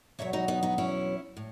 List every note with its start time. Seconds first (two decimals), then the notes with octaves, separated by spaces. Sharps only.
0.19 E2 B2 F#3 C#5 E5
0.33 D#4 F#4
0.48 B3 D#4
0.63 B3 D#4
0.78 C#4 E4
1.37 A2